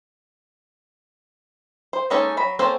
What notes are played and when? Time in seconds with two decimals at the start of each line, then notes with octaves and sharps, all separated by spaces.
1.93 C5
2.10 G#3 A#3 C#4 D#4 A4
2.37 F#3 B5
2.59 A#3 C4 C#4 A4 C5